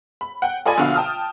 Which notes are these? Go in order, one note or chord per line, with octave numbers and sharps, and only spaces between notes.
B5
F#5 G5
F4 A4 D5 D#5 G#5 B5
A#1 B2 D3 F5 F#5
G5 A5 D#6 F6